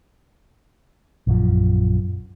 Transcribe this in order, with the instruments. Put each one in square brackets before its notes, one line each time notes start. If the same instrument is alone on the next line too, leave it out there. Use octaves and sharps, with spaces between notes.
[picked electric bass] A#1 F#2 F3